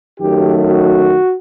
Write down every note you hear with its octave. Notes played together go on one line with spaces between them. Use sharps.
F#2 D#3 F#3 A3 G4
F#4